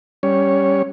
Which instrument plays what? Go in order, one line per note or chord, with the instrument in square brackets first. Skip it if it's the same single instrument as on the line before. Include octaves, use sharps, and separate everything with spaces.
[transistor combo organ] G3 C#4 C#5